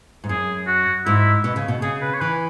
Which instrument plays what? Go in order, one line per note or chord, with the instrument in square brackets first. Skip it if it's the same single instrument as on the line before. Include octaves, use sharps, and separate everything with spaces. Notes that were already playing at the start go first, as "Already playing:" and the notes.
[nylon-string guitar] G#2
[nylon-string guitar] F#2 [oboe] G#4
[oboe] F#4
[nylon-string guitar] G#2 [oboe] E4
[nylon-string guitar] B2
C#3
B2
[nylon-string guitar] C#3 [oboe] G#4
[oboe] B4
C#5
[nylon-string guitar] E3 [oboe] B4